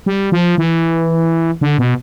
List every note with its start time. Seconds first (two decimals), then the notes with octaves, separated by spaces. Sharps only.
0.06 G3
0.32 F3
0.58 E3
1.61 D3
1.79 B2